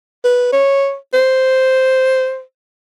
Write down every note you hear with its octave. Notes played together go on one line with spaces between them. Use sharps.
B4
C#5
C5